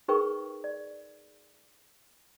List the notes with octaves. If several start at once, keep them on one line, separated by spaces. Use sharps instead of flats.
D#4 G#4 A#4 B4 G5 C#6
D5